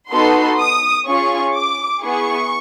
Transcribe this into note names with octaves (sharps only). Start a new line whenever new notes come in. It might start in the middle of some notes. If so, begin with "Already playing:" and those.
B3 D#4 F#4 A4 C6
D#6
C#4 F4 G#4 C#6
D6
B3 E4 G#4 C#6